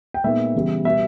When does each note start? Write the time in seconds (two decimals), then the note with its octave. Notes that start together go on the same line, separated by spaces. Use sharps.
0.14 G5
0.24 A#2 G#3 B3 D#4 E5
0.54 C#3 E3 G3 B3
0.85 B2 G3 B3 E5